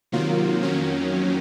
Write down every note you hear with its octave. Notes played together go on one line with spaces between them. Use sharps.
C3 D#3 F#3 A#3 F4
F2 D#3 F#3 A#3 C#4